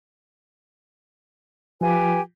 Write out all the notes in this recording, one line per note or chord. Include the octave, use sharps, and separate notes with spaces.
F3 F4 G4 B4 G#5